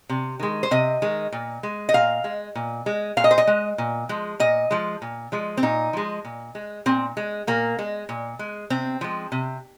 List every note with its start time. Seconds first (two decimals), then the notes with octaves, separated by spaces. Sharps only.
0.09 C3
0.40 D#3 G#3
0.63 C5
0.71 C3 D#5
1.02 D#3 G#3
1.32 A#2
1.63 G#3
1.89 D#5
1.94 A#2 F5
2.24 G#3
2.55 A#2
2.86 G#3
3.17 A#2 F5
3.24 D#5
3.31 C5
3.38 D#5
3.47 G#3
3.78 A#2
4.09 F3 G#3
4.40 A#2 D#5
4.71 F3 G#3
5.02 A#2
5.32 F3 G#3
5.57 C4
5.63 A#2 D#4
5.93 F3 G#3
6.25 A#2
6.55 G#3
6.86 A#2 C4
7.17 G#3
7.47 A#2 A#3
7.79 G#3
8.09 A#2
8.39 G#3
8.70 C3 C4
9.01 F3 G#3
9.32 C3